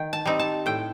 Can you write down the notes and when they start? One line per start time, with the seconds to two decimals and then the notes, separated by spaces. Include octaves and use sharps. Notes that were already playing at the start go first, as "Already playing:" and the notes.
Already playing: D#3 G5
0.13 A5
0.25 G3 C4 D#4
0.39 A5
0.66 A2 G5